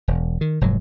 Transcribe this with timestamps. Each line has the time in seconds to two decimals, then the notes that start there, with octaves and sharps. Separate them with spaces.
0.08 E1
0.41 D#3
0.61 F1 G#2 F#3